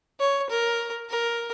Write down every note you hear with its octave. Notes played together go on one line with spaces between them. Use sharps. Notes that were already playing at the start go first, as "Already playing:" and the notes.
C#5
A#4
A#4